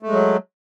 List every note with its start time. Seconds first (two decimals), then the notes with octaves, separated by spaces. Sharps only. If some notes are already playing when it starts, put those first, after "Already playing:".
0.03 A3
0.07 G#3
0.12 F#3